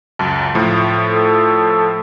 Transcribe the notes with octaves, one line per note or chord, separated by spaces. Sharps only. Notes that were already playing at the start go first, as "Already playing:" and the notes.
C#2 F#2 A5
A2 F3
A4